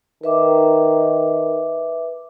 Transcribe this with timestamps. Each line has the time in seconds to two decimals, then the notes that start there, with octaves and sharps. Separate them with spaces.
0.24 D#3 B4 E5 D6